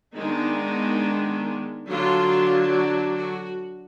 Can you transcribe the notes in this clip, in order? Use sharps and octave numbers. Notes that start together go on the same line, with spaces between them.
D#3 G#3 B3 D4 D#4
D3 F#3 D4 F4
F#4
F#4